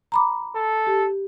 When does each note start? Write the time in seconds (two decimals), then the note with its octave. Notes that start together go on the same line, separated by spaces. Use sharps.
0.12 A#5 B5 D6
0.56 A4
0.87 G4